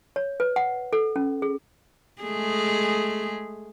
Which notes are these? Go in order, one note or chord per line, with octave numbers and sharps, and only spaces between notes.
C#5
B4
F#5
A4
C#4
G#4
G#3 A3 G#4